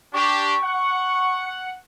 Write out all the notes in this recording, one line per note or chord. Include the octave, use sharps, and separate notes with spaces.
D4 G4 C#6
F#5